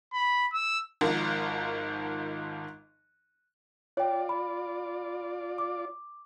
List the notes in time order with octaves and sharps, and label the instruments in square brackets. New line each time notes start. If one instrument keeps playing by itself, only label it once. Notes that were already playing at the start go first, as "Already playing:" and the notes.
[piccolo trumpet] B5
E6
[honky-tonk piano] G#1 G#2 F3 A#4 F#5
[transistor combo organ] F4 D5 [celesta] C#5 G5
[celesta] B5
D6